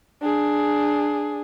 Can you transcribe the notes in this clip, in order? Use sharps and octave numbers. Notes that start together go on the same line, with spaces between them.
D4 G#4